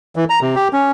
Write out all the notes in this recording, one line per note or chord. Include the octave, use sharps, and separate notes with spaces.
E3
A#5
C3
G4
C#4